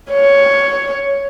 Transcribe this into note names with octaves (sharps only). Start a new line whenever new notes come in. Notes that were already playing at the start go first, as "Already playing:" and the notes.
C#5